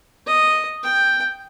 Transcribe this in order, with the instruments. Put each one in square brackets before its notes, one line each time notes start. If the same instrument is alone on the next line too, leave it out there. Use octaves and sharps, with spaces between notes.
[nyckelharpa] D#5
G5